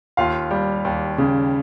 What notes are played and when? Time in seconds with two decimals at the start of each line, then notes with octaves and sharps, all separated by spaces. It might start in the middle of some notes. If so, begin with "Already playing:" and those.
0.17 D#2 F4 F5
0.51 G3
0.85 D#2
1.18 C#3